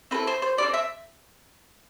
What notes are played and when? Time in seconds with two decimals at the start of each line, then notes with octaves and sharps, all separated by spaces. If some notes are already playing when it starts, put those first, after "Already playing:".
0.11 C4 E4 A4 B4
0.27 C5
0.42 C5
0.57 C4 E4 A4 D5
0.74 E5